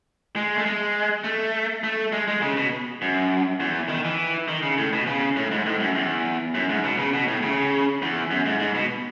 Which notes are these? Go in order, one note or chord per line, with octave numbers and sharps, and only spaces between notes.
G#3
A3
G#3
A3
A3
G#3
G#3
C#3
B2
F#2
E2
D#3
E3
D#3
C#3
A2
B2
C#3
A2
G#2
A2
F#2
E2
F#2
G#2
B2
C#3
B2
A2
C#3
E2
F#2
G#2
G#2
B2